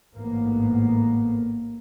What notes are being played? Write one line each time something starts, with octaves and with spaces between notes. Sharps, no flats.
A1 G#2 A#3 B3